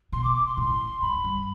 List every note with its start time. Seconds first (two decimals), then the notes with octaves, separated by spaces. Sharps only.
0.12 B2 C6
0.24 D6
0.35 D6
0.46 C6
0.57 A2
1.01 G#2 B5
1.24 G2